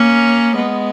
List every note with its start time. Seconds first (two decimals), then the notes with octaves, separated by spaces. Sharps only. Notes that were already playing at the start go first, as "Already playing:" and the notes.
Already playing: A#3 C#4
0.55 G#3 B3